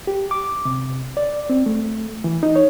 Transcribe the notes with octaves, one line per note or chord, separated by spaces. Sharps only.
G4
D6
C3
D5
C4
A3
E3
D#4
C#5